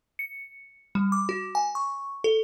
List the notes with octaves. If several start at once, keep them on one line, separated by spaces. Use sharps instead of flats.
C#7
G3
D6
F#4
G#5
C#6
A4